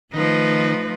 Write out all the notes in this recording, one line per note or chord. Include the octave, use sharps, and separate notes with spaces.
D#3 F3 A3 D#4 B4